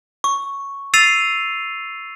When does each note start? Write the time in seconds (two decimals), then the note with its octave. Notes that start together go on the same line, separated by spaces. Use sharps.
0.24 C#6
0.94 E6 A6 C7 D#7 F7